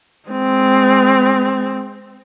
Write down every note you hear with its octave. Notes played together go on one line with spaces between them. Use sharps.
G#3 C4